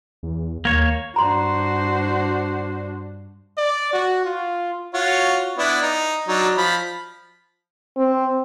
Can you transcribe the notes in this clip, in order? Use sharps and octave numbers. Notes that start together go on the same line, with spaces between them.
E2
D#2 A#3 C#5
G2 D4 F#4 C5 A#5 C6
D5
F#4
F4
F4 F#4 C#5
B3 D4 E4
D#4
F#3 D4 D#4
F3 B5
C4